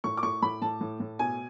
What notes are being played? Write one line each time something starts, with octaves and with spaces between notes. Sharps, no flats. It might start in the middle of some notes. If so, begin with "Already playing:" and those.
A2 C#6
D6
A2 C#6
A2 B5
A2 A5
A2
A2
B2 G#5